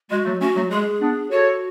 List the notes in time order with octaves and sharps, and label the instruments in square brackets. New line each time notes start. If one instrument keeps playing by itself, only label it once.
[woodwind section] G#3 [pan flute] F#4
[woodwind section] F#3 A3
[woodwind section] A3 C#4 [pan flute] F#4
[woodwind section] F#3 A3
[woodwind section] G#3 [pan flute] G#4
[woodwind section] B3 D4
[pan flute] F#4 [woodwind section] A4 C#5